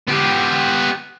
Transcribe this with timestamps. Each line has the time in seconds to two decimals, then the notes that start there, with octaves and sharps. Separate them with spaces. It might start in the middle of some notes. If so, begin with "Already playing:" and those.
0.08 B3 G4